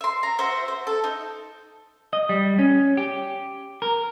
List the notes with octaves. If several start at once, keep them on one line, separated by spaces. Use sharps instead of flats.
E5 C6
A#5
F#4 C5 E5
C5
A4
D#4
D#5
G3
C#4
G4
A#4